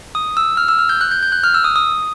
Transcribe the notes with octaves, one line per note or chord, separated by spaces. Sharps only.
D#6
E6
F6
E6
F6
G6
F#6
G6
G6
F#6
F6
E6
D#6
D#6